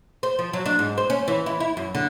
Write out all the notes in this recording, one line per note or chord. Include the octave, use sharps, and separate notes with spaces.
C5
F3
F#3
D4
G#2
C5
C#4
E3
E4
E4
F#2
D3